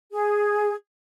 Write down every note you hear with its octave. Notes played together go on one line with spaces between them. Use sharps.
G#4